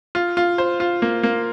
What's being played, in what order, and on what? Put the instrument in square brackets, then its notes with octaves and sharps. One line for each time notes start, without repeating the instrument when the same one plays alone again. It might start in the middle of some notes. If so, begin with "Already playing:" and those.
[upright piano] F4
F4
C5
F4
A#3
A#3